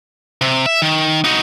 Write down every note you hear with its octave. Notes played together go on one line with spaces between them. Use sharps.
C3
E5
D#3
D#4 F#4